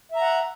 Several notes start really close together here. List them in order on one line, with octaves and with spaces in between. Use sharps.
E5 A#5 F#5